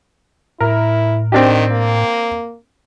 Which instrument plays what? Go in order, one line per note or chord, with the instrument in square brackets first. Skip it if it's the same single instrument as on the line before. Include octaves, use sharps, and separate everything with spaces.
[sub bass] A2 [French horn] E4 [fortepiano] A#4
[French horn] D#3 [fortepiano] C4 D4 G4
[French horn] A#3